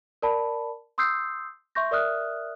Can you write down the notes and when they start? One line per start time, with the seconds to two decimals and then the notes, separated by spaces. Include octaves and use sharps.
0.22 A#4 D5 A5 B5
0.98 C6 D#6 E6 G6 C7
1.75 E5 C6 C#6 G6 A#6
1.91 A#4 D5 E5 D#6 F6 F#6